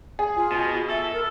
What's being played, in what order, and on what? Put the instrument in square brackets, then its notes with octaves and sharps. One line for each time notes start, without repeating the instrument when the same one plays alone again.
[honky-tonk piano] G#4
[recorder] F4
[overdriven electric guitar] B2
[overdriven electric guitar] A4 [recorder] E5
[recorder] A#4